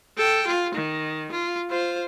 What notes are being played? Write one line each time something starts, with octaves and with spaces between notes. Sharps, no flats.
A4 G5
F4
D#3
F4
F4 C5